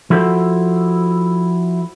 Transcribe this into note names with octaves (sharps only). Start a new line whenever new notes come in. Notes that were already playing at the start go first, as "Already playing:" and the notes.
F3 E4 F#4 A4 A#4 C5